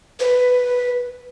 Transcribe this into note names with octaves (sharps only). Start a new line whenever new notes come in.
B4